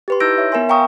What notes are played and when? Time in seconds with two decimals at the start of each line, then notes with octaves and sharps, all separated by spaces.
0.08 G4 B4 C6
0.20 D#4 E4 E6 G6 A#6 D7
0.38 C#5 E5
0.52 B3 A#4 E5 G#5 C6
0.69 F5 G5 A#5 C#6 D#6